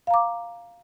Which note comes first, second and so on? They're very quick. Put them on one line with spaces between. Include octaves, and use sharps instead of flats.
F5 A#5 D6